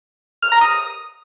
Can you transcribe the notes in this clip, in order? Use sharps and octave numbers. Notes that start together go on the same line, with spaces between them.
F6
A#5
D#6